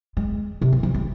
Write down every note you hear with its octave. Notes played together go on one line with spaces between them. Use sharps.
G#3
C3
D#3
F3
G#3